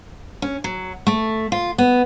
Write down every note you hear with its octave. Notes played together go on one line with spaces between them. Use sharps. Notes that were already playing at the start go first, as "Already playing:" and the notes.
C#4
F#3
A3
F4
B3